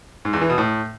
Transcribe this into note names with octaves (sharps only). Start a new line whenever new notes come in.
G#2
E2
E3
B2
A2